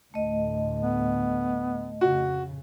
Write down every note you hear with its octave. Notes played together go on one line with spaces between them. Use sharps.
D2 A2 A3 D#5
B3
F2 C#3 F#4